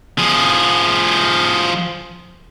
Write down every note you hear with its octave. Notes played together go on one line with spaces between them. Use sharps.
F3 G#4